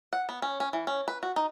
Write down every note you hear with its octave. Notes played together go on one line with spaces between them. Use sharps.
F#5
B3
C#4
C#4
E3
C#4
B4
F#4
D#4